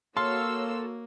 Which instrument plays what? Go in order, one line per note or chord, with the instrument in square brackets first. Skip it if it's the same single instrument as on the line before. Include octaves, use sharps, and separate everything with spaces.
[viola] A#3 [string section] F#4 C#5 E6 [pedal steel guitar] A4 F5 [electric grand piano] C6